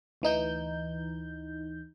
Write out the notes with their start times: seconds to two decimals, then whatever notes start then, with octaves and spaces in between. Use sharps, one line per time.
0.22 D2 E3 D#4 G6